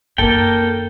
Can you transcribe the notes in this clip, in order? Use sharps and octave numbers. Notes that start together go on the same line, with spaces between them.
F#2 D#3 A#3 A4 G5